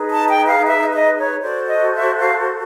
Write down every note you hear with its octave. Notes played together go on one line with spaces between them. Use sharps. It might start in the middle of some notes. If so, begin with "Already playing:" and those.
Already playing: D#4 G#4 B4
A5
G5
F5
E5
D#5
C#5
F#4 A4 C5 D5
D#5
E5
F5